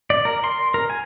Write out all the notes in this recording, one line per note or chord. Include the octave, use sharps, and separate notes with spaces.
D5
A#4
C6
A#4
G#5